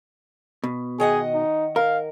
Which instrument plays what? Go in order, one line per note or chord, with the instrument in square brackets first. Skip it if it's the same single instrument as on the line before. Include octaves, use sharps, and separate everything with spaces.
[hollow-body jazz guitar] B2
[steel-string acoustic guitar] D#3 D#5 F#5 [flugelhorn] G#4
[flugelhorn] D#4
[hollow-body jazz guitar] A#4 [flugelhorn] F5